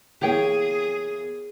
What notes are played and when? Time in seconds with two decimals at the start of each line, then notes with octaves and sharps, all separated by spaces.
0.22 E3 A#3 B3 G4 G#4 C#5 G5